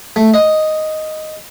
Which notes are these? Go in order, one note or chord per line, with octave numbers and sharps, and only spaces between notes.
A3
D#5